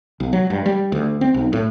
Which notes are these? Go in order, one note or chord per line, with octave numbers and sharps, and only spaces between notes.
B1
F#3
G2
G3
D2
C4
B1
A2